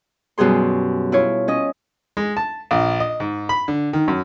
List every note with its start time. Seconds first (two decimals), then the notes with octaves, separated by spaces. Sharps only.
0.38 F#2 B2 G3 G#4 C6
1.12 E4 F4 C#5
1.48 C#4 D#5
2.17 G#3
2.37 A5
2.71 A#1
3.00 D#5
3.20 G#2
3.49 B5
3.68 D3
3.93 D#3
4.08 F#2